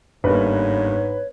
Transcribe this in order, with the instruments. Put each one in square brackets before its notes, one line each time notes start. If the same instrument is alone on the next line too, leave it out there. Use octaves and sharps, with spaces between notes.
[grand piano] G1 G3 A#3 [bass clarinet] G#2 [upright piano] B4 [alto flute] C#5